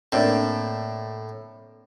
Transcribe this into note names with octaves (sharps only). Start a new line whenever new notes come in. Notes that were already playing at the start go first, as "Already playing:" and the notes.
A2 A#3 C4 D4